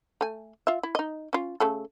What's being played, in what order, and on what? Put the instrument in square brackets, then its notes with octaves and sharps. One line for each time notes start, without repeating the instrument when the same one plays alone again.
[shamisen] A3 G#5
F4 E5
E4
D#4 D#5
C#4 F4
C#3 A3 A4